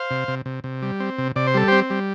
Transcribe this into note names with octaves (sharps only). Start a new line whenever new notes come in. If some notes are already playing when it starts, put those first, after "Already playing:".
Already playing: C5 F5
C3
C3
C3
C3
G3
C4
C3
C3 D5
C5
G3 A4
C4 G4 C5
G3